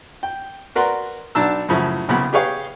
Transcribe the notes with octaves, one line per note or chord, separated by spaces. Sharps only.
G5
F#4 A#4 B4 D5 C6
B1 D4 A5 A#5 E6
F#2 A2 C#3 F3 E4
C2 C#3 F#3 B3 F#5 B5
G4 G#4 B4 C#5 F5 G5